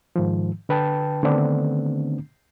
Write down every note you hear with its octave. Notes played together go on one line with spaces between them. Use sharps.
G#2 D#3 F3
D3 B4 G5 A5
D3 D#3 A3 B3 C4 D4